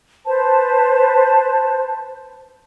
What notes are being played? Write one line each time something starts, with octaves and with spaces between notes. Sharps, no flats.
B4 C5 A5